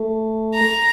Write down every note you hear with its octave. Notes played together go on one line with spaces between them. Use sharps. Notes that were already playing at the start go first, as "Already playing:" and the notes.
Already playing: A3
A#5